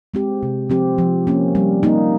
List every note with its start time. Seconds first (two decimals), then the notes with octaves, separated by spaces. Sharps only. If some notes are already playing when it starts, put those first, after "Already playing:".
0.14 G#3 C4 G4
0.43 C3
0.70 F3 C4 G4
0.98 F3
1.27 A#3 C#4
1.55 G3
1.83 A#3 D#4